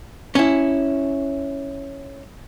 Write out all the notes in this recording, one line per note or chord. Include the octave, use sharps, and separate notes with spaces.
C#4 E4